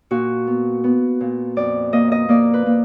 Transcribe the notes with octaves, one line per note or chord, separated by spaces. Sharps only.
A#2 F#4
B3
B3
A#2
F2 D5
A#3 D#5
D#5
A#3 D5
B4
A#3